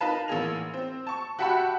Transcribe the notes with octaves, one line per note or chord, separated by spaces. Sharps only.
D#4 F4 A#4 B4 F5 A5
A1 A#3 G#4 F7
C4
A5 C#6
F#4 G4 E5 F#5 A5 B5